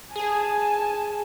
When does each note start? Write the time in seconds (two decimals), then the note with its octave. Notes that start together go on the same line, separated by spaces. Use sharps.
0.16 G#4 G#5 A5